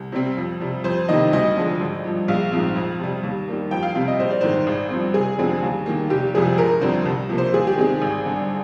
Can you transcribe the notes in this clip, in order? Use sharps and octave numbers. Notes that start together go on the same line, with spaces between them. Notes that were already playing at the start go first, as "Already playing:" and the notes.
Already playing: C2
C3 G3 C4
F2
C3 G3
F2 C5
C3 D#3 A#3 D#5
D2 D#5
D3 F3 G#3
G#1
G2 F3
A#1 F5
G#2 F3 C4
F2
C3 G3
D#2
D#3 G3 A#3
F2 G5
F5
C3 G3 C4 F5
D#5
A#1 C5
D5
G#2 D#3 G#3 C5
G#1
G2 F3 C4
F1 G#4
F2 D3 G#3 C4
D#2
D#3 A#3
F1 G4
F2 C3 F3 G#3 G#4
G1 A#4
F2 D3 G3 C4 C5
C2
C3 F3 A#3
C5
D#2 G#4
G4
D#3 G#3 C4 G#4
G#1
G2 D3